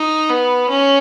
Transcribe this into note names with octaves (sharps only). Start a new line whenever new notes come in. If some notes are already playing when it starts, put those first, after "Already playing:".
Already playing: D#4
B3
C#4